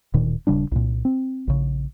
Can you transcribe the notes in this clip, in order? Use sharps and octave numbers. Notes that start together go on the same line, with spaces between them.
D1 A#2 D#3
D#1 C#3 G3 D4
C2 A#2
C4
A#1 C#3